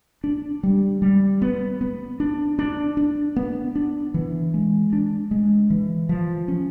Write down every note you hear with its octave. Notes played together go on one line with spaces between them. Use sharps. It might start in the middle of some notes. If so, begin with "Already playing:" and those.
D4
G3
G3
B3
B3
D4
D4
D4
B3
D4
E3
G#3
D4
G#3
E3
F3
C#4